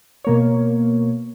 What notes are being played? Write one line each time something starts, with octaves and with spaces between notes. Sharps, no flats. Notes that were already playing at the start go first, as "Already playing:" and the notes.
B2 A#3 C#5